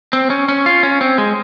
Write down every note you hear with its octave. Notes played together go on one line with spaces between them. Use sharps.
C4
C#4
C#4
F4
C#4
C4
G#3